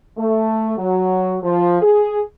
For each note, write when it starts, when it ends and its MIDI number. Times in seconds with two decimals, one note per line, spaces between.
0.18 0.75 57
0.78 1.38 54
1.43 1.80 53
1.82 2.21 68